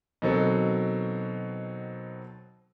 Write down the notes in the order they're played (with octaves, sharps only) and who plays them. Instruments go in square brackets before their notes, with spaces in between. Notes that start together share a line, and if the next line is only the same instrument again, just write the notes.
[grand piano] B2 D#3 F#3 C4 A4